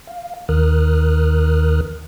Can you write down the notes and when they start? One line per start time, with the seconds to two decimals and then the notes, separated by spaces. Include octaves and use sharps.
0.07 F5
0.49 D#2 D#3 A#4 D#6 F6 F#6